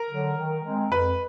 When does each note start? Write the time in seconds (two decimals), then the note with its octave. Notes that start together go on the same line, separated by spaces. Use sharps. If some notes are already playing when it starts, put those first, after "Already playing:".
Already playing: A#4 A#5
0.10 D3 F#3
0.37 D#3
0.64 G#3 C4
0.92 F2 B4 B5